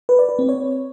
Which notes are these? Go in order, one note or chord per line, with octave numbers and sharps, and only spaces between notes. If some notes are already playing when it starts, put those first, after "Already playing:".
B4
D5
B4
C4
C#5